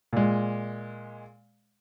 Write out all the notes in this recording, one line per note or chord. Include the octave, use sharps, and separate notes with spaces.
A#2 G#3